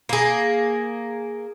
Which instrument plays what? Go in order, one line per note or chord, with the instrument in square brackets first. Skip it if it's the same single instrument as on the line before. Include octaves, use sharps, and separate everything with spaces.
[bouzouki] A#3 G#4